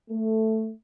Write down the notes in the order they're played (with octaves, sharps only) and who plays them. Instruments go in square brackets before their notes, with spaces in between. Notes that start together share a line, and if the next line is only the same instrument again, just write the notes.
[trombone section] A3